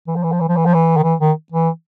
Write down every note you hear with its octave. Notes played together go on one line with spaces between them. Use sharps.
E3
F3
E3
F3
E3
F3
E3
F3
E3
D#3
E3
D#3
E3